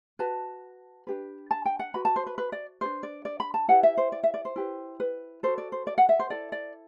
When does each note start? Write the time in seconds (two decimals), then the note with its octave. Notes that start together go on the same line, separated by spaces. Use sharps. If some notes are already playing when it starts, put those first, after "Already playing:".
0.19 F#4 B4 A5
1.07 D4 G4 B4
1.51 A5
1.65 G5
1.79 F#5
1.94 F#4 B4 B5
2.05 A5
2.16 C5
2.27 B4
2.38 B4
2.52 D5
2.81 D4 G4 B4 C5
3.03 D5
3.25 D5
3.40 B5
3.54 A5
3.68 E4 G4 B4 F#5
3.83 E5
3.97 C5
4.12 D5
4.23 E5
4.34 D5
4.45 C5
4.56 E4 G4 B4
5.00 B4
5.43 F#4 A4 C5
5.58 D5
5.72 C5
5.87 D5
5.98 F#5
6.09 E5
6.19 C5
6.30 E4 A4 D5
6.52 D5